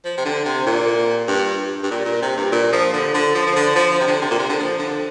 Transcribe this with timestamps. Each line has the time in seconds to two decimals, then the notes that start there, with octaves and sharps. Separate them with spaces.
0.05 F3
0.18 C3
0.25 D3
0.45 C3
0.67 A#2
1.28 G2
1.83 G2
1.91 A#2
2.05 A#2
2.22 C3
2.37 G2
2.52 A#2
2.72 F3
2.93 D3
3.14 D3
3.35 F3
3.47 F3
3.56 D3
3.76 F3
3.91 F3
4.00 C3
4.08 D3
4.22 C3
4.31 A#2
4.39 C3
4.50 D3
4.60 F3
4.79 D3